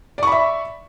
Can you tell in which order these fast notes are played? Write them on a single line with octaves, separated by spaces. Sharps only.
D5 C#6 B5 E5